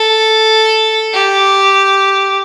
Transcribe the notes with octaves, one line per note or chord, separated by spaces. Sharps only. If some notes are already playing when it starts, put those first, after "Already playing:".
Already playing: A4
G4